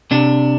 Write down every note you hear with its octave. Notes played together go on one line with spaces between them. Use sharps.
C3 D4